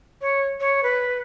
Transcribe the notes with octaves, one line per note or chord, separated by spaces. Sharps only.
C#5
C#5
B4